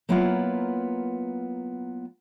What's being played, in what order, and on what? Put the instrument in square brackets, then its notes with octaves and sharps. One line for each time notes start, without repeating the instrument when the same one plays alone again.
[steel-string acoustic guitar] F#3 A#3 B3 E4 F4 F#5